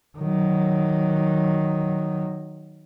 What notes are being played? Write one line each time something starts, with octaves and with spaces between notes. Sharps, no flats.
D#3 F#3